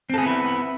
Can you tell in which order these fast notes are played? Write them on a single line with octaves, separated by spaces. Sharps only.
C4 A4 G#4 B3 E4